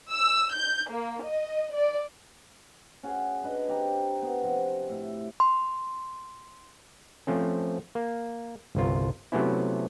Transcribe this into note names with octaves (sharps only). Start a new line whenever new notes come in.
E6
G6
A#3
D#5
D5
C#4 F#4 G#4
D4 B4 D#5
C4 G4 A#5
B3
C3 F3 F#4
A2 E4
C6
F3 A3 C4 C#4
A#3
G1 C2 F4
C3 F#3 A3 B3 C#4 E4